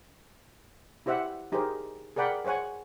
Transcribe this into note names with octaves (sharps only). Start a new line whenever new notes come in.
E4 G4 C5 E5 F#5
D#4 G4 G#4 A#4 C5
G#4 A#4 D5 F#5 G5 B5
G#4 C5 C#5 F#5 G#5